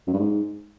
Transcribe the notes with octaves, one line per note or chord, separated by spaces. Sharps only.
F#2
G2
G#2